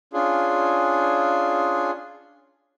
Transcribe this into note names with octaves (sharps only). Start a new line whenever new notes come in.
C#4 D4 F4 G#4